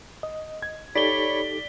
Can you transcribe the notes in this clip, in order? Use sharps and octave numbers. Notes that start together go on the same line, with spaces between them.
D#5
G#6
D#4 G4 A4 C#5 D5 B5 B6 G7